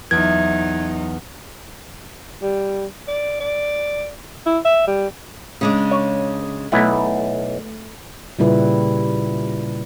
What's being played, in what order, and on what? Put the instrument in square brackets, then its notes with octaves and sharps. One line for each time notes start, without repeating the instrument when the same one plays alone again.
[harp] E2 [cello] F#3 D#4 [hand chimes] G#6
[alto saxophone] G3
D5
D5
E4
E5
G3
[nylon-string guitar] C#3 G#3 D4
[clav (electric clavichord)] C#5
[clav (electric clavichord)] B1 E4 F#5 [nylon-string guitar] A3
[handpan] A#2 C#3 G3 E4 B4